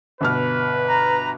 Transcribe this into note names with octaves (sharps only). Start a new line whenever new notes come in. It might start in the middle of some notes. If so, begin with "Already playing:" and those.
G1 B2 B4 F6
A#5